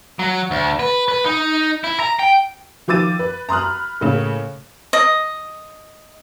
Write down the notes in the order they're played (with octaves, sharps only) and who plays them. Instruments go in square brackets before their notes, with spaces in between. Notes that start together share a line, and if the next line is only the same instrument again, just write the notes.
[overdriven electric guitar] F#3
D2
B4
B4
D#4
E4
A#5
G5
[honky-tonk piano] D#3 F3 D6 E6 A6 D#7
B4
A#5 C6 D#6 F6 F#6
B5
A2 C#3 A#3
[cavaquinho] D#5